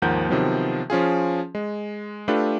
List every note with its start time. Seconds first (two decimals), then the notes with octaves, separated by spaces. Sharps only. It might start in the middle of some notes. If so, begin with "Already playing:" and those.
0.02 D#2 G#2 F3 A#4 F#5 G6
0.29 C3 D#3 F3 F#3 B3
0.90 F3 C#4 F4 G#4
1.55 G#3
2.28 A3 D4 F4 G4 A4 B4